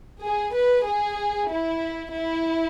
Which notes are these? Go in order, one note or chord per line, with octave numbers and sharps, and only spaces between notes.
G#4
B4
G#4
E4
E4